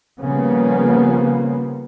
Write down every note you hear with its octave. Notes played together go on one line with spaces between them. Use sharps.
C#3 F3 G3 A#3 B3